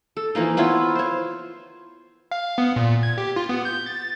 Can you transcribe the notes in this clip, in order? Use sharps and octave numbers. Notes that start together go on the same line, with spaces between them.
A4
E3 F3 A#3 D#4
B3 E4 F4 C#5
C5 C#5
F5
B3
A#2
G#6
G4
F4
B3
G6
A6